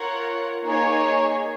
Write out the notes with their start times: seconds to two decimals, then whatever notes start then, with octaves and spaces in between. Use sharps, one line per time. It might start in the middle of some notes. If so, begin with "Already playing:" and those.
Already playing: F4 A#4 C#5 F#5
0.63 A#3 D#4 G#4 C#5